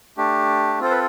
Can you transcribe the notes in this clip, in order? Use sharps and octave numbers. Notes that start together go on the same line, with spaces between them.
A3 D4 G4
C4 F4 A4 C5
B4